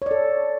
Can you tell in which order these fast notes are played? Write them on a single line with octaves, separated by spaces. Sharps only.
C#5 D5 A4